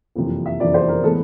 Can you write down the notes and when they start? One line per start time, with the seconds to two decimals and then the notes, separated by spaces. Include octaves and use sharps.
0.15 F#1 F2 C3 E3
0.46 E5
0.60 F#1 F2 C3 E3 D5
0.74 C5
0.88 A#4
1.03 A2 E3 G#3 B3 A4